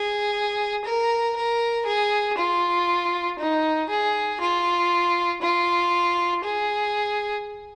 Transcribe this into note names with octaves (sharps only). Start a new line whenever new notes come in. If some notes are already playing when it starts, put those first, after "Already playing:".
Already playing: G#4
A#4
A#4
G#4
F4
D#4
G#4
F4
F4
G#4